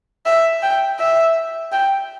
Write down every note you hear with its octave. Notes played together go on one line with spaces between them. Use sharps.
E5
G5
E5
G5